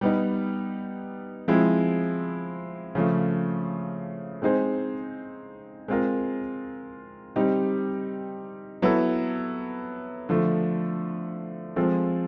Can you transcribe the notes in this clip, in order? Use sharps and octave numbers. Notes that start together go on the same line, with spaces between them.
G3 B3 D#4
F3 G#3 C4 E4
C#3 F3 A3
G#3 C4 D#4 G#4 C5
G#3 C4 F4 A#4
G3 C4 D#4 G4
F#3 B3 E4 A4
D3 F3 A3
F3 G#3 C4 F4 A4